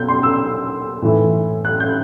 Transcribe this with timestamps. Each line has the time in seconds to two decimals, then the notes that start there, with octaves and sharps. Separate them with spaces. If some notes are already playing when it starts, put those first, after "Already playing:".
Already playing: B2 G6
0.08 C6
0.23 E6
1.02 A2 E3
1.65 F#6
1.80 G6